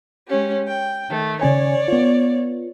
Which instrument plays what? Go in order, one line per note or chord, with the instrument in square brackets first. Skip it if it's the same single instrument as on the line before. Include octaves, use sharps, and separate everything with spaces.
[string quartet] G#3 C#4 G4
G5
D#3 A3
[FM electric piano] C#3 C#4 G#5 [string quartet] C#5 D5
[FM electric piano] B3 F4